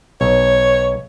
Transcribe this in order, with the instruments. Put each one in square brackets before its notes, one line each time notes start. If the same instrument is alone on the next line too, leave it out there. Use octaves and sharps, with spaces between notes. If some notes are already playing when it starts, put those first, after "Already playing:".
[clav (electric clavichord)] B1 [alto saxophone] C#5